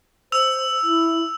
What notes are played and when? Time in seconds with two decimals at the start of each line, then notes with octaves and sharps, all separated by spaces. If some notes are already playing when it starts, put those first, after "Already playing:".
0.32 C5 E6 F7
0.83 E4